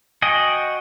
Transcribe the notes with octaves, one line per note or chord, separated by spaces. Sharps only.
F#4 D#5 G5 G#5 D#6